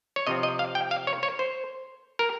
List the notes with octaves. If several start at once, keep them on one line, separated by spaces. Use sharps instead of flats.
C#5
C3 F3 C4 D#5
D#5
F5
G5
F5
C#5
C#5
C5
A#4